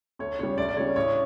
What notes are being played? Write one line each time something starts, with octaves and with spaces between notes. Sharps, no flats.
D2 C#5
C#3 G3 C#5
D2 D5
D5
C#3 G3 C#5
A1 C#5